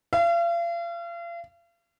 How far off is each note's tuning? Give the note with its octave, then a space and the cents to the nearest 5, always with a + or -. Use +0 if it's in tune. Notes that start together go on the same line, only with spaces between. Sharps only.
F5 -40